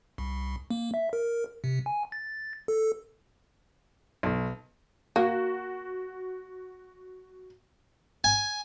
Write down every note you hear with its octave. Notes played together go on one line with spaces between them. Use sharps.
C2
A#3
E5
A#4
C3
G#5
A6
A4
B1
A#3 F#4
G#5